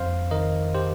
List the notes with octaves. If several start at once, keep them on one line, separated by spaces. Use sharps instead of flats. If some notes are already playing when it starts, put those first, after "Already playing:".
Already playing: F2 C5 F5
D#3 A#4 D#5
G4 C5